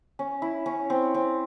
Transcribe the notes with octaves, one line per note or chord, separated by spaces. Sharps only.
C#4
E4
C#4
C4
C4